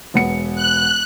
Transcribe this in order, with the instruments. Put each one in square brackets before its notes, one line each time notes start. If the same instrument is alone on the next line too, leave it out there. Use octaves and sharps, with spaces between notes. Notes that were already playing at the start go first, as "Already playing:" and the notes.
[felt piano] E1 B3 C#7
[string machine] F#6